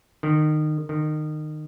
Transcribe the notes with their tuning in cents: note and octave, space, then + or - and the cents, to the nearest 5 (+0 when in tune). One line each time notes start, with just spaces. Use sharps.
D#3 -25
D#3 -25